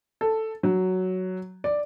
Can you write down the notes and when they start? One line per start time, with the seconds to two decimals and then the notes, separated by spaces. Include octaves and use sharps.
0.21 A4
0.63 F#3
1.64 D5